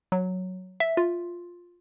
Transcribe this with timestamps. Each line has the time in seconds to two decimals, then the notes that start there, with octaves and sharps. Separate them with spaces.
0.12 F#3
0.80 E5
0.97 F4